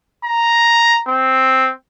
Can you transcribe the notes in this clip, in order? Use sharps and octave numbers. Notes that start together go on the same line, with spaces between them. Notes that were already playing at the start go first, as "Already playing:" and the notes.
A#5
C4